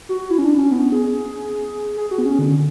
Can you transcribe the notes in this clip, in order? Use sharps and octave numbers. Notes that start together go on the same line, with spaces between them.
F#4
E4
C#4
D4
C#4
B3
G#4
G#4
F#4
B3
C#4
D3